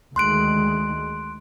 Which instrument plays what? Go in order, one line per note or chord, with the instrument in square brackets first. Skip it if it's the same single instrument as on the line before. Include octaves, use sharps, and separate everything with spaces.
[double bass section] D2 D#3 G#3 [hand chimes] C6 F#6 D7